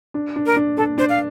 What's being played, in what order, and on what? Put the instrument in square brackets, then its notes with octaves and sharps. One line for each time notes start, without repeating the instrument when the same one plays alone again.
[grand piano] D4
D4
[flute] A#4
[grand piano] D4
[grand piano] D4 [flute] A4
[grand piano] D4 [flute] C5
[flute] F5